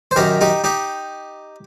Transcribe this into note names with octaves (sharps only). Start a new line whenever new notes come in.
C5
F#2 D#3 G4 A#4
D#4 G4
D#4 G4